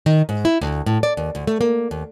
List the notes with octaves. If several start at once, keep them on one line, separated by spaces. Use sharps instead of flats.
D#3
G#2
E4
D2
A2
D5
D#2
D2
A3
A#3
D#2